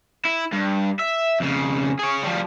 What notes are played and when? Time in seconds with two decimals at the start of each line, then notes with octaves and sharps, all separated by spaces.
0.25 E4
0.52 G2
0.99 E5
1.40 F2 C#3
1.99 G#4 C#5
2.23 F3 G3